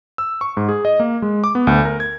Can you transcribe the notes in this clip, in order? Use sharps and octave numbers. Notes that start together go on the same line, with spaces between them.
E6
C#6
G#2
G#4
D#5
A#3
G#3
D6
B3
D2
A#4
G#6